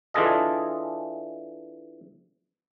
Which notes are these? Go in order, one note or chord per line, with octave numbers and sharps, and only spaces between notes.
E3 D4 F4 G#4 A4 D#5